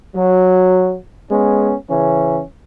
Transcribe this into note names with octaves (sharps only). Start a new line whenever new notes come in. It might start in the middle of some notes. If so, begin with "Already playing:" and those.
F#3
G#3 B3 C#4
C#3 E3 C#4